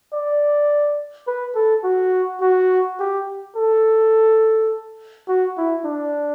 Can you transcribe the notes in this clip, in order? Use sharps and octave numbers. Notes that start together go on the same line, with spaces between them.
D5
B4
A4
F#4
F#4
G4
A4
F#4
E4
D4